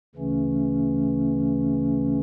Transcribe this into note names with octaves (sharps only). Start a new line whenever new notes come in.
D2 C#3 E3 A3 C#4